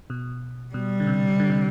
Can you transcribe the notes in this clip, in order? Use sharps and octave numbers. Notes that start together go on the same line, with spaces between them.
B2
B2 G3
D3
C3
D3
C3